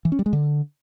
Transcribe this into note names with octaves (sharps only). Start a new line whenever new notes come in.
E3
C#4
G3
G#3
D3